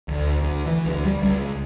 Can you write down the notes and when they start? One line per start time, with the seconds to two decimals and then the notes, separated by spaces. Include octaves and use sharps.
0.08 D2
0.42 D2
0.66 E3
0.85 D2
1.05 G3
1.22 C#2